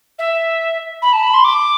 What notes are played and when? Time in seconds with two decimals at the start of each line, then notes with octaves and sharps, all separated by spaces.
0.18 E5
1.02 B5
1.13 A5
1.23 B5
1.33 C6
1.44 D6